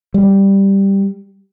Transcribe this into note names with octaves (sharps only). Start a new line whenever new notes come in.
G3